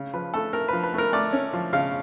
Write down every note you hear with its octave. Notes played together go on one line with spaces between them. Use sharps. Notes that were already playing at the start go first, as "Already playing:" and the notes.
Already playing: C#3
F3 B4
A3 A4
A3 A#4
B4
F3
B4
A3 A#4
A3 D5
C#4
F3
C#3 F5